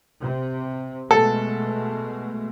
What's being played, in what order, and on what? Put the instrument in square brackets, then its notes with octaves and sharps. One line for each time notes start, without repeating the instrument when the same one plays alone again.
[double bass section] C3
[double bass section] B2 G#3 A3 [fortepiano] A4